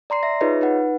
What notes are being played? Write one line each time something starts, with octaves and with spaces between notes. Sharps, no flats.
D5 A#5 C6 C7
E5 A#6
D#4 F4 G#4 B4 C#5 D#5
D#4 B4 F#5